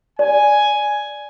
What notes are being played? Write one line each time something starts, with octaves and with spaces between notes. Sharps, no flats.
D5 G#5